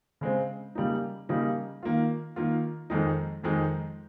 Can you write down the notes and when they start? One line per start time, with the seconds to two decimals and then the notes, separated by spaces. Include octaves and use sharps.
0.21 C#3 G#3 C4
0.75 C#3 G3 A#3 D#4
1.29 C#3 G3 A#3 D#4
1.83 D#3 A#3 F4
2.36 D#3 A#3 F4
2.90 F2 D#3 G#3 D#4
3.44 F2 D#3 G#3 D#4